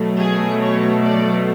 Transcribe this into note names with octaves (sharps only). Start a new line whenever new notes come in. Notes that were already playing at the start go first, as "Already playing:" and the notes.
Already playing: B2 F#3 A3
G#4
C#5
D5